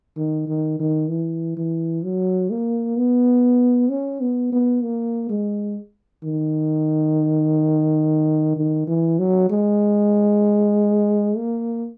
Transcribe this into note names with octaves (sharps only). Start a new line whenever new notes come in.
D#3
D#3
D#3
E3
E3
F#3
A#3
B3
C#4
B3
B3
A#3
G#3
D#3
D#3
E3
F#3
G#3
A#3